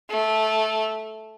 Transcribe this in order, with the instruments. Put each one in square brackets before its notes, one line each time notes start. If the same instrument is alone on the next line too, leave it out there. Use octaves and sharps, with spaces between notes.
[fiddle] A3